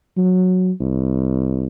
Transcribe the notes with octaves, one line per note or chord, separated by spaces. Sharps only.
F#3
C2